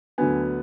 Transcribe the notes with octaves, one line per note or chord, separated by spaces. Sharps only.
D2 D3 F#3 B3 G#5